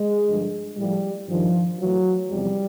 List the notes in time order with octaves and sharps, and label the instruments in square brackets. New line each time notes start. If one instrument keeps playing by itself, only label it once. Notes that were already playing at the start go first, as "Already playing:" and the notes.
Already playing: [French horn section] G#3
G2 D3 F3
A2 F3 G3
G2 D#3 F3
A2 E3 F#3
E2 C3 F3 G3